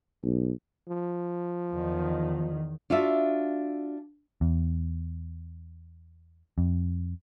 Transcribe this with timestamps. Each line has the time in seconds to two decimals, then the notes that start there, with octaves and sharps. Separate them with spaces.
0.24 B1
0.88 F3
1.71 E2 D#3
2.90 D4 F4 F#4 E5
4.41 E2
6.58 F2